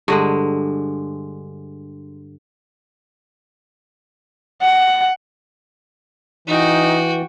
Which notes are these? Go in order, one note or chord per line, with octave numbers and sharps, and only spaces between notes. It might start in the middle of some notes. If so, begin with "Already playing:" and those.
G2 D3 G#3
F#5
E3 D#4 F#4 G5